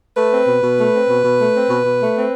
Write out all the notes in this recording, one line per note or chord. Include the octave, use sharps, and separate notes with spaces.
A3 B4
C4
B2
B2
A3
C4
B2
B2
A3
C4
B2
B2
A3
C4